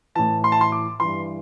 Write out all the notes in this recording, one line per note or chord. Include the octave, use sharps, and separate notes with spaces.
A2 E3 A5
C6
A5
C6
D6
G2 E3 C6